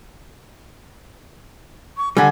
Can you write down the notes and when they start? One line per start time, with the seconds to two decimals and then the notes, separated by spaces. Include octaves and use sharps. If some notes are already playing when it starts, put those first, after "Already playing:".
1.97 C#6
2.17 D3 G3 G#5